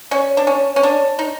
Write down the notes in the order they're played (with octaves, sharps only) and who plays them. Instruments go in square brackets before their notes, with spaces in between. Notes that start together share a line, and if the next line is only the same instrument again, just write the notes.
[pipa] C#4 [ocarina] C#5 D5
[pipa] D4
C#4
C#4
D4
D#4